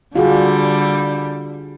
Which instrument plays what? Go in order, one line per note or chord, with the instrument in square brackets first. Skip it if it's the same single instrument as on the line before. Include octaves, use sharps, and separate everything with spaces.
[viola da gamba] D3 G3 [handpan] F4 F#4 G#4